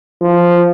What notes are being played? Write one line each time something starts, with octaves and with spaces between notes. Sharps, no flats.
F3